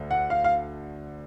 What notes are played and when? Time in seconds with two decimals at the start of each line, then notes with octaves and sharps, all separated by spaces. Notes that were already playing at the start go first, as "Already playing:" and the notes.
Already playing: D2 D3
0.11 F#5
0.30 F5
0.44 F5